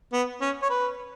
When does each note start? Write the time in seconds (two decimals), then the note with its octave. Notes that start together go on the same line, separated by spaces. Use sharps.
0.13 B3
0.41 C#4
0.62 C#5
0.70 B4